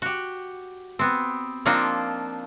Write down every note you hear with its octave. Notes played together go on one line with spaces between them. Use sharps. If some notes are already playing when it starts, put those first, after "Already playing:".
F#4 G4
B3 C4
F3 A#3 C4 D4 D#4 F4